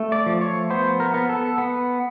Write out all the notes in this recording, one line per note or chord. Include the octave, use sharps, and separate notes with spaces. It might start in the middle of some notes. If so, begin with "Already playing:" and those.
Already playing: A3
D5
F3
C#5
B3 C5
A#4
B3
A4
B3